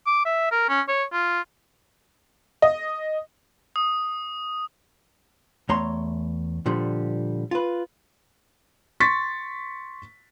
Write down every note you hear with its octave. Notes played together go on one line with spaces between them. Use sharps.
D6
E5
A#4
C#4
C#5
F4
D#5
D#6
E2 A3 C#5 A#5 C6
A#2 D3 F3 G3
F4 B4
C6 C#6 A6 B6